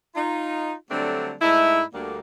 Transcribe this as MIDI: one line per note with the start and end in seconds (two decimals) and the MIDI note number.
0.15 0.73 63
0.15 0.73 65
0.90 1.32 50
0.90 1.32 54
0.90 1.32 55
0.90 1.32 57
0.90 1.32 60
0.90 1.32 62
1.40 1.82 44
1.40 1.82 57
1.40 1.82 63
1.40 1.82 64
1.93 2.18 38
1.93 2.18 50
1.93 2.18 55
1.93 2.18 58